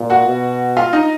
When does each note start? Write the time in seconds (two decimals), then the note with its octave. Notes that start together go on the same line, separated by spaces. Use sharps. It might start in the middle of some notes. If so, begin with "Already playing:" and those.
Already playing: A#2
0.10 F#4 F#5
0.27 B2
0.77 F4 F5
0.93 D#4 D#5